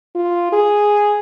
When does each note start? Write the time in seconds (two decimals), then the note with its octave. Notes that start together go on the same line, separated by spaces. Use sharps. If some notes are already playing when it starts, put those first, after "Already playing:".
0.15 F4
0.53 G#4